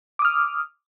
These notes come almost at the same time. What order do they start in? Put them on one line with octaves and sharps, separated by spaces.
D6 D#6 F6